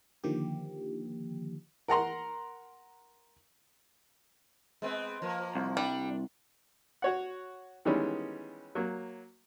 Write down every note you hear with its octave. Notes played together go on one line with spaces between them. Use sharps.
D3 D#3 F3 A#3 G4
A#4 F#5 A#5 C6
G#3 B3 C4
F3 A#3
C2
G3 D4
F#4 C#5 F#5
D#3 E3 G3 G#3 B3 C#4
F#3 A#3